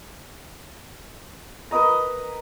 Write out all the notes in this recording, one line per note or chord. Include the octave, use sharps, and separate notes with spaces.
A#4 B4 D#5 A#5